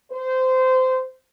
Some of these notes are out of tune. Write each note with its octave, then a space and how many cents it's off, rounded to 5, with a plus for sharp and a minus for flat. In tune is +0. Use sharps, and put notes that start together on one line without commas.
C5 -20